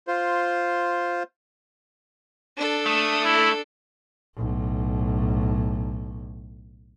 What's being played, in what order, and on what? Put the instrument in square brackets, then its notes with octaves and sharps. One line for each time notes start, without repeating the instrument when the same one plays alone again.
[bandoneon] F4 C5
[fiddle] D4 A4
[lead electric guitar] A3 [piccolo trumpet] D#6
[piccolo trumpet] E4
[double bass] B1 A2